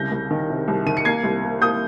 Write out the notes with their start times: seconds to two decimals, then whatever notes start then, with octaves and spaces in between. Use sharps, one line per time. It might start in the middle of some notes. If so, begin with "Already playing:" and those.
Already playing: C2 C#3 G6 A#6
0.11 C2
0.31 D#3
0.50 C3
0.68 C2
0.86 D#3 D#7
0.97 C#7
1.05 A#3 G#6 C7
1.24 C2
1.44 A#3
1.62 A#3 D#6 G6